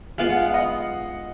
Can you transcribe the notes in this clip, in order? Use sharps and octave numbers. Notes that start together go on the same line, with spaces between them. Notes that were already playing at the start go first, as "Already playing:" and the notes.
G#3 B3 F4 F5
F#5
F5
D#5